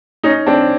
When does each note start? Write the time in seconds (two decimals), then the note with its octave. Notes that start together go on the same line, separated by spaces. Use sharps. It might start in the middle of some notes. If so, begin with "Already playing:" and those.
0.23 C#4 D#4
0.46 C4 D4